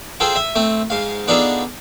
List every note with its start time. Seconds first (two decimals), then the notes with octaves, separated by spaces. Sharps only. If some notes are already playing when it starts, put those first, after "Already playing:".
0.20 F4 G#4 A4 C5 G5
0.36 E5 D#6
0.55 A3 C4
0.90 G#2 F5
1.28 B3 D4 D#4 F4 G#4 A4